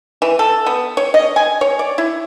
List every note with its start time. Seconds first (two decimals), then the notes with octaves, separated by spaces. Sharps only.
0.22 E3
0.39 A4
0.66 B3
0.97 C#5
1.14 D#5
1.36 G#5
1.61 C#5
1.79 D5
1.98 E4